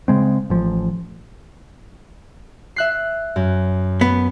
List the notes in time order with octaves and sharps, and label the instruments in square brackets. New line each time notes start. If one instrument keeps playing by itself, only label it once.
[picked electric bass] C#3 G#3 C4
A1 F3
[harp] E5 F#6 C7
F#2
[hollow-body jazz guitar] B3